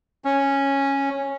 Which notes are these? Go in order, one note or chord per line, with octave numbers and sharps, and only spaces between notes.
C#4